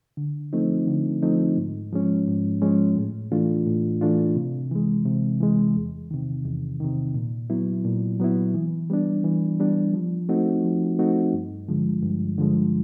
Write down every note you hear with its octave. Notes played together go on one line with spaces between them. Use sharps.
D3
F3 A3 C4 D#4
D3
F3 A3 C4 D#4
G#2
F3 G#3 C#4
G#2
F3 G#3 C#4
A2
E3 A3 D4 F4
A2
E3 A3 D4 F4
C3
E3 G#3
C3
E3 G#3
E2
C3 D#3
E2
C3 D#3
A#2
F#3 B3 E4
A#2
F#3 B3 E4
E3
G3 B3 D4
E3
G3 B3 D4
F3
A3 C4 D#4 F#4
F3
A3 C4 D#4 F#4
G2
D3 F3 G#3
G2
D3 F3 G#3